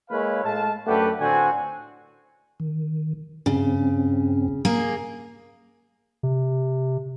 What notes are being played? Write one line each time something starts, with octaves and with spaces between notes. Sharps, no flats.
G#3 A#3 E4 B4 C#5 F5
A2 G#3 F5 A5
F#2 A3 D4 G4 B4 F#5
A2 D3 C4 F#4 F#5 G#5
D#3
G2 C#3 C4 C#4
A#3 G#4
C3